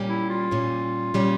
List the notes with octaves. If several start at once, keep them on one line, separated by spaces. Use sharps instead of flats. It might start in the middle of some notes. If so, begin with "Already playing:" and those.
Already playing: A#2 G3 C#4
E4
F4
A#2 G3 C#4
A#2 G3 C#4